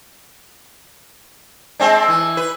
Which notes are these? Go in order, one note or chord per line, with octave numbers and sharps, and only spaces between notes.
G#3 C4 D4
E3
B4